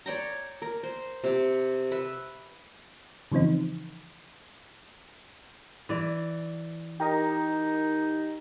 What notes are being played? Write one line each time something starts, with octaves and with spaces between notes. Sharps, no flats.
C#5 D5 G5 A#5
A#4
C5
C3 G4
B4 E5
C#3 E3 F3 C4 D#4
E3 D5
D#4 G4 A#4 D#5